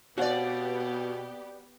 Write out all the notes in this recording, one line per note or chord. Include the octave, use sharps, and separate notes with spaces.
B2 B3 C4 F#4 G4 D5 F5 F#5